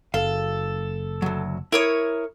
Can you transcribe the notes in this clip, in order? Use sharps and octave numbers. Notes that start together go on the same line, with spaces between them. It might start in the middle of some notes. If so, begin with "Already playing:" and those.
F#1 A4 F5
D2 F#3
E4 A#4 C#5 D#6